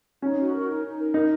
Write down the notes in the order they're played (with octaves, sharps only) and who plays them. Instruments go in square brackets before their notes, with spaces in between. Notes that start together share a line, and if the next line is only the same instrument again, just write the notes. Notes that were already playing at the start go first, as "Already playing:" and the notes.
[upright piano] C#4 [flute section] D#4
[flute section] F#4
A#4
D#4
D#4
A#4
[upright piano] D#4 [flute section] A#4